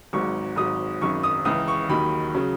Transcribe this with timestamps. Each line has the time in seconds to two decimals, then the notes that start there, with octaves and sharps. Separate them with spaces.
0.13 G#1 G#2 F#3 C#6
0.56 G#1 G#2 F#3 D#6
1.01 G#1 F#2 D#3 C#6
1.23 D#6
1.45 C#2 C#3 E3 D#6
1.68 C#6
1.89 D#2 D#3 F#3 B5
2.35 C#3 F#3